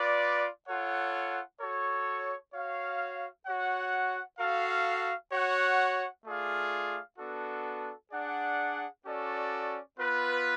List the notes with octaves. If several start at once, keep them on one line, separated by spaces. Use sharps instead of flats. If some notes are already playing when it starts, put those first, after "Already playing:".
Already playing: F4 B4 D5
F4 A4 C#5 F#5
F#4 A4 C#5
F#4 C#5 F5
F#4 C#5 F#5
F#4 A4 F5
F#4 C#5 F#5
A3 F4 G#4 D5 F5
B3 D4 F#4 A4
D4 G#4 D5 F#5
C#4 F#4 A4 D5
B3 F4 B4